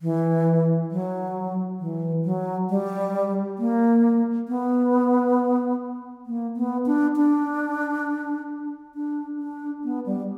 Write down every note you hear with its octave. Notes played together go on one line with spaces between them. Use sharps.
E3
F#3
E3
F#3
G3
A#3
B3
A#3
B3
D4
D4
D4
D4
B3
G3